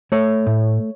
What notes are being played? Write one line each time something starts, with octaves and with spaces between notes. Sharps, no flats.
A3 C#5
A2